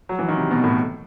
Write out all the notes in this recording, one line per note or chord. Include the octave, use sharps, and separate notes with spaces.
F#3
E3
D#3
C3
B2
A2